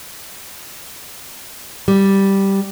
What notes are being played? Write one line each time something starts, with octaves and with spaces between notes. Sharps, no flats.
G3